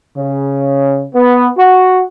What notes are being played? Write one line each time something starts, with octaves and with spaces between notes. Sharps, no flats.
C#3
B3
F#4